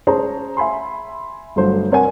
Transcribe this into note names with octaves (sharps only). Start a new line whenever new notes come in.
C#4 G#4 C5 C#5 A5 A#5
E5 G#5 B5 C6
G1 F#3 A3 C5
C4 A#4 C#5 F#5 G#5